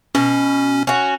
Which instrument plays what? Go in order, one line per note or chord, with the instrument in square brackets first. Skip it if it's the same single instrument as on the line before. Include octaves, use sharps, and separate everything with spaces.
[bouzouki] B2 [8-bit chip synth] C#4
[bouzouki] C#4 F#4